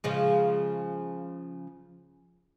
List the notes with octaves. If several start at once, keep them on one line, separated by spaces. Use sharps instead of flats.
C#3 F3 G#3